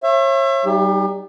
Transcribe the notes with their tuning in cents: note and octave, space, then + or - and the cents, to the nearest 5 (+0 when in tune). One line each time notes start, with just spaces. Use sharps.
C#5 -35 E5 +30
G3 -30 D#4 +0 G4 +30